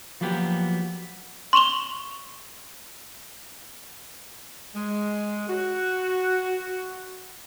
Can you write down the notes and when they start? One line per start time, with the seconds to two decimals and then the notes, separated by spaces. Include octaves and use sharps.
0.21 F3 F#3 A#3 B3 G4
1.53 C6 C#6 E7 F7 G7
4.75 G#3
5.49 F#4